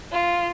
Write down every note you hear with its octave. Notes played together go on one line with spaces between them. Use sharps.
F4